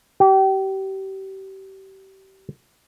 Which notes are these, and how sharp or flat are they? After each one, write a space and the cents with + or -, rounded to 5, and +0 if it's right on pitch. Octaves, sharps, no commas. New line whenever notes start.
G4 -30